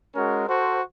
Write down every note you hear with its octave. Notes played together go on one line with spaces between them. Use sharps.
G#3 C#4 F#4 A#4
F#4 A4 C5